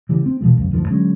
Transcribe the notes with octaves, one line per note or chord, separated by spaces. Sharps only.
C#3 E3 G3
C4
B2 E3 F3 G#3
C#2 F#2
D2 G2 D#3 F3
D3 F#3 G#3 C#4